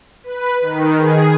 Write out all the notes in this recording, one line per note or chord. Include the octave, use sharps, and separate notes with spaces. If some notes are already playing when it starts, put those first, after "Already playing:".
B4
D#3
G#4